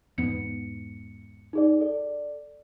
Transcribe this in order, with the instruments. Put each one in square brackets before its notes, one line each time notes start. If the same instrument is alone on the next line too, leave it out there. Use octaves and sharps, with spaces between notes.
[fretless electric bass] E2 G#2 B3 [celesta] C#7
[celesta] D#4 G#4 D5
A4 D5